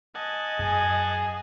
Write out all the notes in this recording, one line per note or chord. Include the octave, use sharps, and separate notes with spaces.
D#5 F#5 G#5 A5
F#2 G#4